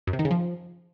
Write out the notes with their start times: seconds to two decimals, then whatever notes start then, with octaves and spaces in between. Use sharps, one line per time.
0.07 F#2
0.13 C3
0.19 D#3
0.25 C#3
0.31 F3